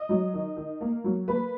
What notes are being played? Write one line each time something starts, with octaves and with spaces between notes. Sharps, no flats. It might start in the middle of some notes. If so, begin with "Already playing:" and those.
Already playing: D#5
F#3
D#3
D#3
A#3
F#3
A#3 B4